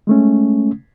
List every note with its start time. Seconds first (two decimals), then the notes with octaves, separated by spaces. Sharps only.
0.07 G#3 A3 C#4